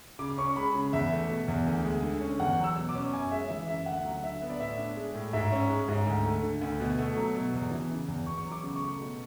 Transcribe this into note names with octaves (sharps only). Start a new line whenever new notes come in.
C#3 D6
C#4 C#6
G#3 B5
C#3
E2 E5
A3
B2
E2
D2
G#3
D3
C#4
E2 F#5
F#3
E6
B2
D6
C#4
F#2 G#5
G#3 E5
E3 E5
F#2 E5
D2 F#5
F#3
D3 E5
B3
D5
A2 E5
D4
G#3
A2
G#2 E5
C#4
G#3
G#2
D2
A3
D3
D2
B2
A3
F#3
B2
E2
E3
C#3
E2
E2 C#6
F#3
D6
C#3
C#6
A3
B2